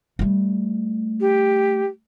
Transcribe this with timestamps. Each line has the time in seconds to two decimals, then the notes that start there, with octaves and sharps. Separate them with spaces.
0.19 G3 A3
1.21 G4